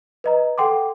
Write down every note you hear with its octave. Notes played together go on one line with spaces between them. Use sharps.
B4 D#5 A#5
A4 F#5 G5 C6 D6